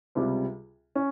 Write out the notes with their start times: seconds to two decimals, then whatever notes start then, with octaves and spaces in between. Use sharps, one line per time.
0.15 C#2 C3 G3
0.95 C#4